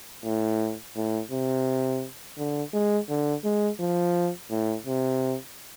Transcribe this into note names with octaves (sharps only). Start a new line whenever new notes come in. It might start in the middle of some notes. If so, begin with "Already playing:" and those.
A2
A2
C3
D3
G#3
D3
G#3
F3
A2
C3